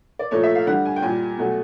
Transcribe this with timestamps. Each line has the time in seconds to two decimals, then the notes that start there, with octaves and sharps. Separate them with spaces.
0.19 D5
0.31 A#2 F3 A3 C#5
0.44 E5
0.55 F5
0.67 D3 G3 F#5
0.85 G#5
0.96 G5
1.02 A#2 G3 G#5
1.38 B2 F#3 A3